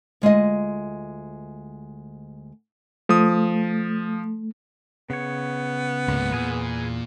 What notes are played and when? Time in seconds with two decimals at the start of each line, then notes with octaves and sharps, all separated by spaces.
0.22 D2 G#3 F4 D#5
3.09 F3 A3 D#6
5.10 C#3 B3 C#5
6.08 C#2 G#2 A#3
6.32 E2 A#2 G#4 B4